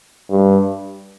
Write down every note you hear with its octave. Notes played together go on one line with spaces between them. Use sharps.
G2